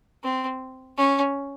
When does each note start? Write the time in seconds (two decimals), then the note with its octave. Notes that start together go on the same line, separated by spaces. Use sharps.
0.24 C4
0.98 C#4